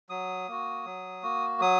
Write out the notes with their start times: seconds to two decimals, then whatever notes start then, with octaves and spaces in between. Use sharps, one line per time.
0.10 F#3 D#6
0.48 A#3 F#4
0.85 F#3
1.23 A#3 F#4
1.60 F#3 D#6